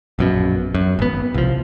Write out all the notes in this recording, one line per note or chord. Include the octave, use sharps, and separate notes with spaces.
A#1 F#2 B2
F#2
G#1 B3
C2 F3